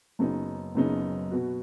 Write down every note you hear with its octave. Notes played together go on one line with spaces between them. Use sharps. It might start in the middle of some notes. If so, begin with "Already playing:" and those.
F#1 F#2 C#3 B3 D#4
F#1 F#2 C#3 B3 D#4
B2 B3 F#4